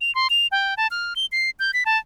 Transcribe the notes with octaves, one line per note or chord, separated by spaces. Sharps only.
F7
C6
F7
G5
A5
F6
G7
C7
G6
B6
A5